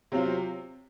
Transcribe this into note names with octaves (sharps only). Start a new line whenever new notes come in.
C3 F#3 C4 F4